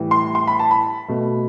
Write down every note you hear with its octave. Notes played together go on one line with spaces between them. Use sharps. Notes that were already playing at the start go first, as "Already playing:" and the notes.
Already playing: A2 E3 G3
C6
C6
B5
A5
B5
B2 A3